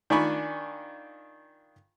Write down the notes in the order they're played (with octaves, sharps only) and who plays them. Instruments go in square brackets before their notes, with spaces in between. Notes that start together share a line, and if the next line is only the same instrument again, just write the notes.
[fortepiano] D#3 D4 F4 G#5 B5 C#6